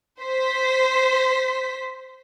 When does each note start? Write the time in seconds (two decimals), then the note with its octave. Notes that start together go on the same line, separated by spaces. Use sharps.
0.20 C5 B6